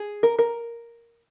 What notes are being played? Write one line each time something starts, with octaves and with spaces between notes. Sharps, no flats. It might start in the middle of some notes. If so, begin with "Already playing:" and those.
Already playing: G#4
A#4
A#4